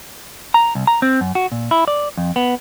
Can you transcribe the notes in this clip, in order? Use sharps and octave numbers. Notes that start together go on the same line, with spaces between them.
A#5
C2
A#5
C4
F#2
F#4
A#2
E4
D5
F2
B3